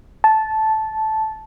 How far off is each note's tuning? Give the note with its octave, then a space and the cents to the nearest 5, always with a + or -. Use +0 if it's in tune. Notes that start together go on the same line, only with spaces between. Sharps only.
A5 -10